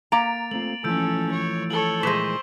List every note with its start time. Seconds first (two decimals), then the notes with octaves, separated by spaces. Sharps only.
0.12 A#3 A#5 A6 D7 F7
0.51 A3 C4 F4 F#7
0.84 E3 F3 A3 C#4 A4 E6 G6 D7
1.32 C#5
1.70 A4 C#5 F#7 G7
2.03 A#2 G#3 C5 C#6 B6 E7